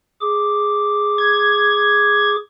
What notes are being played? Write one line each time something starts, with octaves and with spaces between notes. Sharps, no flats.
G#4 D6
G#6